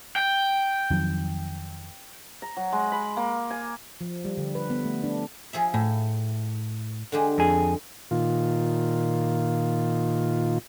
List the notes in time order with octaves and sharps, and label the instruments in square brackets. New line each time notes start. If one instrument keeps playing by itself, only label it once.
[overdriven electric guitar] G5
[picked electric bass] F2 D#3 F#3
[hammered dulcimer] A#5
F#3
G#3
B5
A#3
G#5
[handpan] F3
G3
D3
B4
B3
A3
D4
[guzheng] F3 G#4 E5
[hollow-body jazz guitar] A2 [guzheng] E4
[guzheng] D3 G#3 G4
[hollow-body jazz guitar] F2 G#4
[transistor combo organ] A#2 D#3 F4